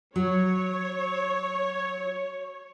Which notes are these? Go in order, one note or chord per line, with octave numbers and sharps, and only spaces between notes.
F#3 C#5